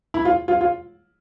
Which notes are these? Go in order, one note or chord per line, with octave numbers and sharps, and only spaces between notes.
E4
F4
F4
F4